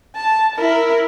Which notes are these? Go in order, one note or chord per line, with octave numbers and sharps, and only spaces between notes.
A5
E4 A#4